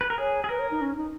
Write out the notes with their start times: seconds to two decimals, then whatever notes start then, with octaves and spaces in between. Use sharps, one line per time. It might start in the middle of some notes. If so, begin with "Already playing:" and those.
0.01 B4
0.10 A#4
0.18 G#4 C#5
0.44 G#4
0.49 A#4 B4
0.59 C#5
0.71 D#4
0.81 C#4
0.97 D#4